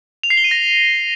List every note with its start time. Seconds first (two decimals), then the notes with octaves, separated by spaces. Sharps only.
0.23 F7
0.30 C7
0.37 G7
0.44 D#7
0.51 A#6